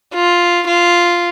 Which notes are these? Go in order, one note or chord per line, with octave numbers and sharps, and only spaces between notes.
F4
F4